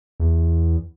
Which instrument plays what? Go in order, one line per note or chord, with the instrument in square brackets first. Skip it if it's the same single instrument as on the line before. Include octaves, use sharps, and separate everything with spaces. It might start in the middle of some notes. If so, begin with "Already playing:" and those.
[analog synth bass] E2